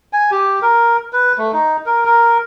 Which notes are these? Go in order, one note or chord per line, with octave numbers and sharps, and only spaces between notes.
G#5
G4
A#4
B4
A3
D#4
A#4
A#4